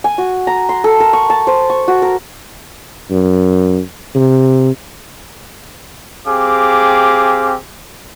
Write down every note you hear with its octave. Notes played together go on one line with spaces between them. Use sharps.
G#5
F#4
A#5
C6
A4
A#4
C#6
A5
C5
C#6
F#4
A#4
F#2
C3
C4 G4 G#4 F5 D6